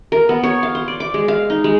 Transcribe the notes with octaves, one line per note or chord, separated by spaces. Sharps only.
A#4
B3
C#5
F5
C5
D5
D6
G#3
F5
D#4
G#3